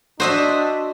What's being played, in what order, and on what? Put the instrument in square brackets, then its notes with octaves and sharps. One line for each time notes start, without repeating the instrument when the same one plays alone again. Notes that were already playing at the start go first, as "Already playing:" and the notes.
[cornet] D4 [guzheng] F#4 D#5 E5 [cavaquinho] C5 D#6